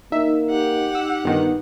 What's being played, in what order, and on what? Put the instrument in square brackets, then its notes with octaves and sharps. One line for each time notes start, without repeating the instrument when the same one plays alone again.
[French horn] A#3 [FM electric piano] D#4 [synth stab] E5
[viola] G4 F#5
[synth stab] E6
[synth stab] G1 D#3 [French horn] B3